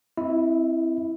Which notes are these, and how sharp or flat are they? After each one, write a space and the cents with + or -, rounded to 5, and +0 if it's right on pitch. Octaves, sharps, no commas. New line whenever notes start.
C4 +0 E4 +0 D#5 +40